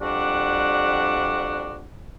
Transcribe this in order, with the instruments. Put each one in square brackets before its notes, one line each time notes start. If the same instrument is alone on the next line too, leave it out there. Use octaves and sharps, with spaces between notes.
[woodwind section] F2 G3 D4 F#4 F#5